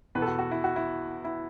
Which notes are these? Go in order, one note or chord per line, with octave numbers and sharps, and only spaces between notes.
E2 B2 B3 B4
A4
F#4
F#4
E4
F#4
E4
E4